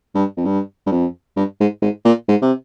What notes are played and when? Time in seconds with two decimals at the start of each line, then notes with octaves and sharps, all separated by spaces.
0.15 G2
0.37 F2
0.46 G2
0.87 G2
0.92 F2
1.37 G2
1.60 G#2
1.82 G#2
2.05 A#2
2.28 G#2
2.42 C3